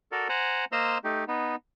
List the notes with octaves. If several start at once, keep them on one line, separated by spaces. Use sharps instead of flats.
F#4 A4 A#4 D5
C5 F#5 G#5 A#5
A#3 C5 D#5 A#5 C6 E6
A3 D#4 G4
B3 D#4